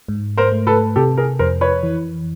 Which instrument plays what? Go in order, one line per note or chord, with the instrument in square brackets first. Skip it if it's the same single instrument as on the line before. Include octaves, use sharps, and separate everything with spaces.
[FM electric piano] G#2
[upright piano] A#4 C5
[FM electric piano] A3
[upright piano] A4 B4
[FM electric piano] C3 [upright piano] G4 A4
[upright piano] G#4 A#4
[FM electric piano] F2 [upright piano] A#4 C5
[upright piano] B4 C#5
[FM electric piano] E3